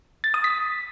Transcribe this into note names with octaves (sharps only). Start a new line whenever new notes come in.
A6
D#6
B6